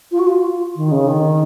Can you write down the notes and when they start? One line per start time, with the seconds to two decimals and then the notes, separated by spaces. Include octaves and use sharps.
0.11 F4
0.19 F#4
0.26 F4
0.76 D#3
0.91 C#3
1.07 D#3